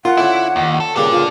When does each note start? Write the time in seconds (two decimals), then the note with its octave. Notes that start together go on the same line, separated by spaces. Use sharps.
0.05 F4 A#4 F#5
0.17 D3 C#4 E4
0.56 D#2
0.80 A4
0.96 G2 A#2 C#3 A4 D5
1.12 F4